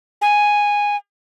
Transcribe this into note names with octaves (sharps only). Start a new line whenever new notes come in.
G#5